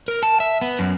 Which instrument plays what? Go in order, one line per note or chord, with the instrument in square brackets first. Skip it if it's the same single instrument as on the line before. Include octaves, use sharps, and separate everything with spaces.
[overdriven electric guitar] A#4
A5
E5
B3
F#2